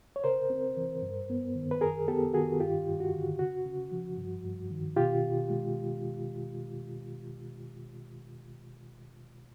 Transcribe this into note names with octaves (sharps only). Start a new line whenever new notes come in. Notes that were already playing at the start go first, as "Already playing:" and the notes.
C#5
C#3 A#4 C5
C4
E3
G2
B3
D#3
B4
F#2 G#4 A#4
B3 G4 A4
D#3 F#4 G#4
G2 F4 G4
G2
F#4
D3
C#3 F#4
C#3
F3
G2
G2
D#3
B2 F4 G4
B2
G#3